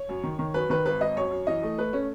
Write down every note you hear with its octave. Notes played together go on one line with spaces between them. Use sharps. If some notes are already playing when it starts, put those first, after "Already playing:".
Already playing: C#5
F#2
D#3
D#3
F#2 B4
D#3 B4
G#1 B4
G#1 D#5
F#2 C#5
F#2
E3 D#5
A3
A3 B4
A3 C#4